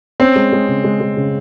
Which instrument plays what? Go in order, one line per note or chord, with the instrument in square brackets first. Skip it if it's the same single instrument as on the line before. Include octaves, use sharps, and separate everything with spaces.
[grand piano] C4 [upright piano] C#4
[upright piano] G#3
G#3
C#3
G#3
G#3
C#3